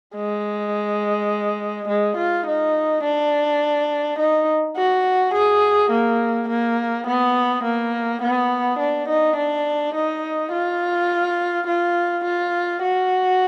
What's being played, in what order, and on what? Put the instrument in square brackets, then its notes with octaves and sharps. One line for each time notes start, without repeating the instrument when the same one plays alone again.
[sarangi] G#3
G#3
F4
D#4
D4
D#4
F#4
G#4
A#3
A#3
B3
A#3
B3
D4
D#4
D4
D#4
F4
F4
F4
F#4